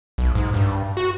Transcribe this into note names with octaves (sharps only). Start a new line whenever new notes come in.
B1
G#2
G2
F#4